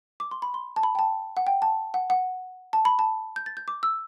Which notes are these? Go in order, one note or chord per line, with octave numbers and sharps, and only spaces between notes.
D6
C6
B5
C6
A5
B5
G5
A5
F#5
G5
A5
F#5
F#5
A5
B5
A5
G6
A6
G6
D6
E6